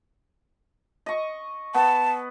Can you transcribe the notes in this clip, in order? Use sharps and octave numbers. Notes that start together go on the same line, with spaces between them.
D#5 C#6
B3 A5